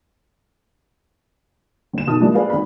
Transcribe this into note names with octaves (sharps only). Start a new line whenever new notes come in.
G1 E7
B2 D#3 A5 D#6
F3 G3 G#3 A#3 D4 E4
E4 G#4 B4 D5 F5
G#1 B5